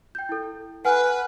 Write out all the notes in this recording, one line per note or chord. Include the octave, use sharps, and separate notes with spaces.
G5 G6
E4 A4
B4 F#5 G#5 F6